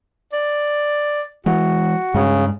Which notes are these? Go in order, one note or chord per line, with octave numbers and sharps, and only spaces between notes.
D5
E3 G#3 F#4
G2 C#3 G#3